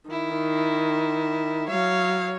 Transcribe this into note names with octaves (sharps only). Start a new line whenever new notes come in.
D#3 E4
F#3 C#5 F5